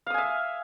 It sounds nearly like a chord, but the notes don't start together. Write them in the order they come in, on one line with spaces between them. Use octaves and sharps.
F5 D#6 G#5 E5